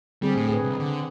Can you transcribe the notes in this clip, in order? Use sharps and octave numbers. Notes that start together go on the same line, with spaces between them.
D3 G3 C4 G#4
A2
G#4 B4
C2
D3